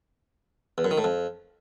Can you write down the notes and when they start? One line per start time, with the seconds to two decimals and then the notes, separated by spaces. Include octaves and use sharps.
0.78 E2
0.85 F#2
0.91 D#3
0.98 A2
1.04 F2